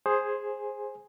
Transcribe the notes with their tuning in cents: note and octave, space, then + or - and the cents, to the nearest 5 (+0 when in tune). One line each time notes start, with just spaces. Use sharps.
G#4 +0 C5 +10 G#5 +0